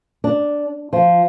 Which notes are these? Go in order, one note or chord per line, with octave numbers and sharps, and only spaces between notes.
D4
F3